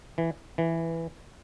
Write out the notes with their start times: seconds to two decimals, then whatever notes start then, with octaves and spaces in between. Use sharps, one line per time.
0.18 E3
0.58 E3